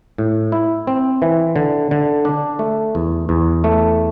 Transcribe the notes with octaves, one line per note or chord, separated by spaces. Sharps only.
A2
E4
C4
E3
D3
D3
D4
A3
E2
E2
A3